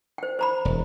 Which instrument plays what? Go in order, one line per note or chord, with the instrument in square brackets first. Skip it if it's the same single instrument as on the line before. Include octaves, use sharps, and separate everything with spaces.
[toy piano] C5 G5
C5 A#5 B5
[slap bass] E1